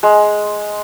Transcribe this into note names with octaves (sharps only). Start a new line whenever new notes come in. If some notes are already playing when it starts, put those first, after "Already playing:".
G#3